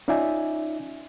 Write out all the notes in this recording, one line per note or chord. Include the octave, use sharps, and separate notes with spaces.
C#4 D#4 F4 D5 E5 G#5